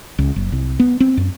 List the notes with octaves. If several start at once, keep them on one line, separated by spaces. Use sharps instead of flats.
C#2
F#1
C2
B3
C4
F#2